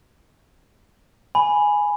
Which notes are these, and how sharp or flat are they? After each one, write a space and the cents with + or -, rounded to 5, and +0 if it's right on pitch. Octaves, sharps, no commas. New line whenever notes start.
G#5 +0 B5 +0